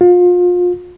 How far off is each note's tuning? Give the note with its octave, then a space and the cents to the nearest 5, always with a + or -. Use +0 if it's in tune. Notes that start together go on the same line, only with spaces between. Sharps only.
F4 +30